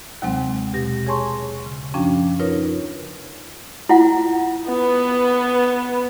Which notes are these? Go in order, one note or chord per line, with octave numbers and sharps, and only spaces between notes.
D#2 C3 F#3 G#3 C4
B2 G4 A#6
G#4 C#5 G#5 A5 C6 C#6
C#3
F#2 F3 C#4 D4 G5
D#4 F4 A#4 B4 C#5
E4 F4 F#5
B3 B4